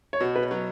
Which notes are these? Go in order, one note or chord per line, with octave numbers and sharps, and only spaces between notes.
C#5
B2
B4
F#3